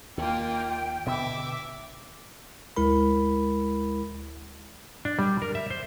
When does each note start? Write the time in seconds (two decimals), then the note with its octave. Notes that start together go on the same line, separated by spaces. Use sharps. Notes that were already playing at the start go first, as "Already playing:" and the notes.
0.18 D#2 A#3 F4 G5
1.06 B2 D3 B3 E5 D6
2.76 D2 G#3 E4 A#4 B5
5.05 D4
5.19 G3
5.42 A#4
5.55 E5
5.71 C5